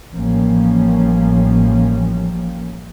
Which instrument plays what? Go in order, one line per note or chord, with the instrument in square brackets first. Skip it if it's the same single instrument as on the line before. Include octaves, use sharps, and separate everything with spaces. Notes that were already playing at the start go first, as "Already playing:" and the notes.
[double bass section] A1 F3 G3 A#3 C#4